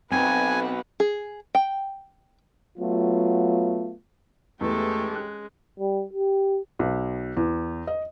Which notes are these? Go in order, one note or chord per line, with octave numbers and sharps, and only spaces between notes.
B1 C4 B4 F#5 G#5
G#4
G5
F#3 A3 B3 F4
E2 E3 G#3 A3 C#4 G4 A4
F#6
G3
G4
B1
E2
D#5